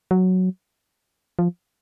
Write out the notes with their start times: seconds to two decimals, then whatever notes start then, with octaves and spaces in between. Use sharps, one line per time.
0.11 F#3
1.39 F3